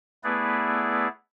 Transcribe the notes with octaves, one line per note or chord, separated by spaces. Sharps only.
A3 B3 E4 G#4 B4 D5